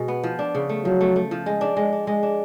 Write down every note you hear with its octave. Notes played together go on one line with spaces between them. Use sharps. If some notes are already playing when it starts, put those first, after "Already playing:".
Already playing: B2 G#3
B3
F3
D4
C#3
A3
F3 F#3
A3
A3
F3
G#3
D4
G#3
D4
G#3
D4